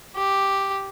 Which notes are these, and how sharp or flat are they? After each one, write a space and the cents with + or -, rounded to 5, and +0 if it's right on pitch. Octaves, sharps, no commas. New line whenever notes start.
G4 +0